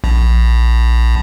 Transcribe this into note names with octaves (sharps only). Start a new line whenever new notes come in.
A#1